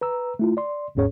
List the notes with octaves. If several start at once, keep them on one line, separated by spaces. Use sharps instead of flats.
B4 A#5 E6
A3 E4 F4
D5 C6
G1 D#2 G#2 C#4 G#4 C#5